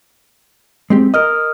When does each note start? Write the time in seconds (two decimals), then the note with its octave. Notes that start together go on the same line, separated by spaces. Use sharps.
0.90 G#3 C4 G4
1.14 A#4 D#5 D#6 F6